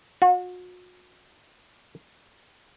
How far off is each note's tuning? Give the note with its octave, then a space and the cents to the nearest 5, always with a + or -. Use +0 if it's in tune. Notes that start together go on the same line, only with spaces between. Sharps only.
F#4 -40